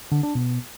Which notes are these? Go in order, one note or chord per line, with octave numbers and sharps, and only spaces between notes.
D3
D4
B2